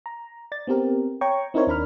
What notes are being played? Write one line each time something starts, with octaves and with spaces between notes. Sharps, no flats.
A#5
D5 A6
B3 C4 G4 A#4
C#5 G5 A#5 C#6
C4 D#4 E4 A#4 C5 C#5
D#2 D4 A#4 B5 F6